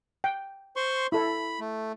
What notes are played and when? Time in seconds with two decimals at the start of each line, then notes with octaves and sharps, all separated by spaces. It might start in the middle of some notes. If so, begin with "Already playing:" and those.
0.24 G5
0.76 C5 C6 C#6
1.12 E4 A4 E5 B5
1.60 A3